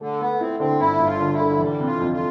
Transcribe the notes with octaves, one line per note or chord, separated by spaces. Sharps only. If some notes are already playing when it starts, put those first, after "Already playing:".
D3 A3
A3 B3
C4 E4
D3 C4
G1 E4
G1
F4
D3
E4
D3
E3 G3
C3
F4
F2
F4